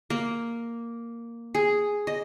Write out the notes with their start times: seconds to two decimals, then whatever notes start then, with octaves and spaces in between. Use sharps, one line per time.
0.10 A#3
1.55 G#4
2.07 D#5